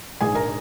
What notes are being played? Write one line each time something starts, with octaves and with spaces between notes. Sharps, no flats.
A#1 G#2 D#3 G#4 G#5
A#4 A#5